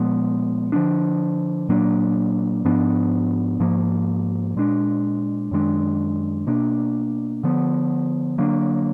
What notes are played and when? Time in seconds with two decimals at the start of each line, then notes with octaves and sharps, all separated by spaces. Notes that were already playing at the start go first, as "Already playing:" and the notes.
Already playing: A#2 F3 G#3 B3
0.72 D3 F3 B3 D4
1.69 A#2 F#3 A#3 D4
2.65 G#2 F3 B3 D4
3.60 G#2 F3 A#3
4.56 A#2 G#3 D4
5.51 F#2 D#3 G#3 D4
6.47 B2 A#3 D4
7.43 D3 F3 B3
8.38 D3 F#3 A#3 D4